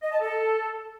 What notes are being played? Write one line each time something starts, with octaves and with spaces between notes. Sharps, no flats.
D#5
A5
A4